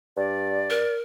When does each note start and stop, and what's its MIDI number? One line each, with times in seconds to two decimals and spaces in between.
0.17 0.81 43
0.17 0.94 74
0.70 1.01 70